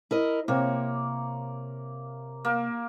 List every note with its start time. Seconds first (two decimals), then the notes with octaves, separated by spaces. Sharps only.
0.11 E4 A#4 D#5
0.48 C3 A#3 C#5
2.45 A#3